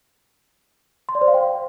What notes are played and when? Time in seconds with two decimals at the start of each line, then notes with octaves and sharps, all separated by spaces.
1.09 C6
1.15 D5
1.21 C5
1.28 F5
1.34 G5